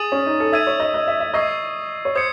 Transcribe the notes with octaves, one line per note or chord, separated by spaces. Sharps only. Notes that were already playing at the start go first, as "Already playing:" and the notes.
Already playing: G#4 D#6 A6 D#7 F#7
C#4
D#4
A4
E5 E6 G#6 D#7
C#5
D#5
D#5
E5
E5
D#5 C#6 E6 G#6 C7
C#5
C5 D#6 G#6 C#7